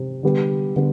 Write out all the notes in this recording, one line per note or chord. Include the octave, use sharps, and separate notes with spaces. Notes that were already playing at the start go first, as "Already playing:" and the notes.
Already playing: C3
D3 G3 B3
D3 G3 B3